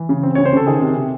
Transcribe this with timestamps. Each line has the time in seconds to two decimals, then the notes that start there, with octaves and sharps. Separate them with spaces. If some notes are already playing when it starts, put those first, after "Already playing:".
Already playing: E3
0.09 C#3
0.23 C4
0.35 C#3 C#5
0.45 C5
0.53 C#3 A4
0.67 D#3 G#4
0.81 C3
0.97 C3